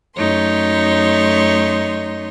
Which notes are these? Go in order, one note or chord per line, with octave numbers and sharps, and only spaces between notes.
F#2 A3 D#4 C#5 C6